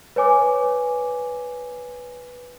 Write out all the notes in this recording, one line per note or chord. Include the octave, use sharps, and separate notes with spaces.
B4 C#5 G#5 D6